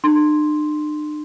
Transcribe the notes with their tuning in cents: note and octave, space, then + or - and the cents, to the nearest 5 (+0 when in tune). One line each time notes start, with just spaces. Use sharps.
D4 +45 C6 +0